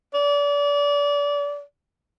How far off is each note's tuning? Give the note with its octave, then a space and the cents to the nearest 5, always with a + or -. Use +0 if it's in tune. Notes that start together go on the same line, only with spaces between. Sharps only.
D5 -30